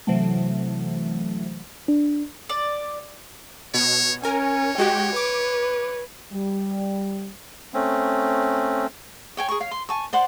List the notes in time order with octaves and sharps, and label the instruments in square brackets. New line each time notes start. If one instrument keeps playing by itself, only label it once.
[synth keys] C3 E3 F#3 A3
[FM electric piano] D4
[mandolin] D5
[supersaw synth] B2 [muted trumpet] C#5
[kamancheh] C#4 [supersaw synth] A#4 G#5 [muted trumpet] C#5
[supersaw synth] G#3 F#4 G4 [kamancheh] G5
[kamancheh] B4 [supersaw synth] D6
[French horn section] G3
[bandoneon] A3 C4 C#4
[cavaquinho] C#5 G5 G#5
G#4 A#4 C#6
C#5 F5
C6
G#5 A5 C#6
C5 D5 F#5 C6